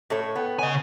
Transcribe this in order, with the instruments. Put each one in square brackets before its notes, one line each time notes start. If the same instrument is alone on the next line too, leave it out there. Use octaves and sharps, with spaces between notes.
[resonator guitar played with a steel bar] A2 A4 C#5
[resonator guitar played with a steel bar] B3 [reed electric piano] B4 F#5 G5
[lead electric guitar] C#3 G#5 [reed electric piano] C#5 D#5